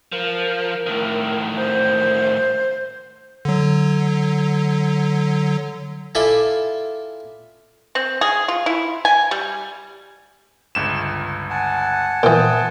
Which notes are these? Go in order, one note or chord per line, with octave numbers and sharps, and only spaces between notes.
F3 A#4
A2 D#3
C5
D3 F#3
E4 F4 A4 D5 G#5 B5
C4
G#4
F4
E4
G#5
G3
G1 C#2 E7
F#5 G#5 A5
A#2 E3 G5 D#6